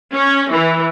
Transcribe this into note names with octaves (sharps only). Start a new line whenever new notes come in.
C#4
E3